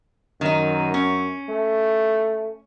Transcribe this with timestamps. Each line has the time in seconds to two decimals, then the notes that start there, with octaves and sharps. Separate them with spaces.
0.41 F#2 D#3 D#4
0.94 C#4
1.49 A3